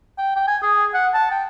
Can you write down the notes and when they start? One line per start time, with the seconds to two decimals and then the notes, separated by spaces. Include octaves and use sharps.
0.18 G5
0.36 G5
0.47 G#5
0.62 G#4
0.94 F#5
1.14 A5
1.31 G5